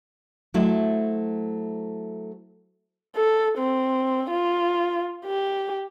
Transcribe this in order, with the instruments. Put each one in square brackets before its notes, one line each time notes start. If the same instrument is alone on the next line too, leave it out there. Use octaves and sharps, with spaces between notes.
[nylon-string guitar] F#3 A3 E4 C5
[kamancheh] A4
C4
F4
G4